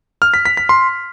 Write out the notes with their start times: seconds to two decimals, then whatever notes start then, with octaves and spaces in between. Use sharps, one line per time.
0.22 F6
0.34 B6
0.45 B6
0.57 B6
0.69 C6